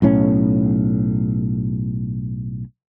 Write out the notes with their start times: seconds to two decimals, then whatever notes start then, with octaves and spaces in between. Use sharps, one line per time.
0.02 B1 A2 C#4